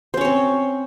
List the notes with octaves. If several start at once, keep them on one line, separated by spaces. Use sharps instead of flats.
C4 C#4 C5 C#5